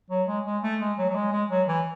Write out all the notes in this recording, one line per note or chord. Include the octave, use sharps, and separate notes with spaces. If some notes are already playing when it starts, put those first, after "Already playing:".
F#3
G#3
G#3
A3
G#3
F#3
F#3
G#3
G#3
F#3
E3